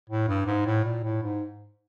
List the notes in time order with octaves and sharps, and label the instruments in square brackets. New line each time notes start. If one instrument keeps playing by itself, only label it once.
[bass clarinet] A2
G2
G#2
A2
A#2
A2
G#2